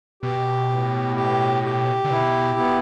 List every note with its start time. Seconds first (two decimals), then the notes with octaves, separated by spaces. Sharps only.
0.23 B2 G4
0.70 A2
1.16 G4
1.64 G4
2.04 D3
2.10 B2 E4
2.58 B3